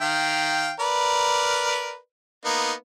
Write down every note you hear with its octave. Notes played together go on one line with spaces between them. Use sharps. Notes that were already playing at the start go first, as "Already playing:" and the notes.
D#3 F5 G5
A#4 B4 D5
A#3 B3 D#4